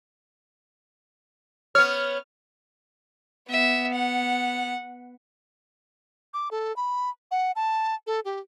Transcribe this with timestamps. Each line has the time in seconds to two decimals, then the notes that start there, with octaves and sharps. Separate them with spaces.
1.75 B3 C#5 F6
3.50 B3 E5
3.94 F#5
6.34 D6
6.51 A4
6.76 B5
7.31 F#5
7.56 A5
8.07 A4
8.25 G4